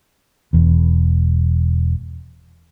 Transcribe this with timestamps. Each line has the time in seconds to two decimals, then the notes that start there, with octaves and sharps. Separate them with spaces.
0.53 E1 E2